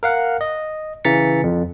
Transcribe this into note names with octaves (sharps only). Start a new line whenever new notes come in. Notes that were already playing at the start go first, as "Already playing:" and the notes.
A#4 F5 F#5
D#5
C#3 E3 A#5 A6 B6 C#7
F2